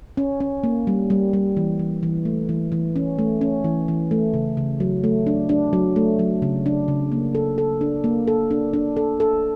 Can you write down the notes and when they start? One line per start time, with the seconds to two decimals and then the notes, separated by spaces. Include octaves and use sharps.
0.17 C#4
0.40 C#4
0.64 A#3
0.87 G3
1.10 G3
1.33 G3
1.57 E3
1.79 E3
2.03 E3
2.25 A3
2.49 E3
2.72 E3
2.96 C#4
3.19 A3
3.41 C#4
3.64 E3
3.88 E3
4.11 A3
4.34 C#3
4.57 C#3
4.80 F#3
5.04 A3
5.27 D4
5.49 D4
5.73 F#3
5.96 A3
6.19 F#3
6.42 C#3
6.66 D4
6.88 C#3
7.12 A#3
7.35 A4
7.58 A4
7.81 D4
8.04 A#3
8.27 A4
8.51 D4
8.74 D4
8.97 A4
9.20 A4